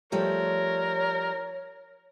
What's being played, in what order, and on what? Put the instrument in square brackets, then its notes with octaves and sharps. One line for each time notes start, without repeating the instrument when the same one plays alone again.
[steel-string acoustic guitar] F3 G3 A3 [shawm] A#4 [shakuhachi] C#5